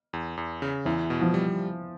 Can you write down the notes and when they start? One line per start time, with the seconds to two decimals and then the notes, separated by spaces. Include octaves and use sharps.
0.13 E2
0.37 E2
0.62 C#3
0.85 E2 E3
1.10 B2
1.21 F3
1.34 G3